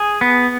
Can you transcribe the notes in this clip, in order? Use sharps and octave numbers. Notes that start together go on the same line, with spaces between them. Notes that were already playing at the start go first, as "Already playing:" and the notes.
Already playing: G#4 G#5
B3